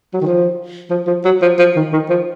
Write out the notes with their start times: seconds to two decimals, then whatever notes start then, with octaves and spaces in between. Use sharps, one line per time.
0.14 F#3
0.21 D#3
0.26 F3
0.90 F3
1.07 F3
1.25 F#3
1.42 F3
1.58 F3
1.76 D#3
1.93 D#3
2.10 F3